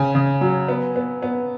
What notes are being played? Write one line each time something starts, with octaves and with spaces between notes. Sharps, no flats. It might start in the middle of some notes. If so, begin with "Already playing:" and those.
Already playing: C#3 G#5
C#3
F#3
B3
B3
B3